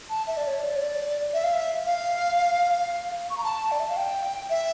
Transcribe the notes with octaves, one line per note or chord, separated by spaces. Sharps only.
A5
E5
D5
C#5
D5
C#5
D5
E5
F5
E5
F5
C#6
A#5
A5
D5
E5
F5
G5
E5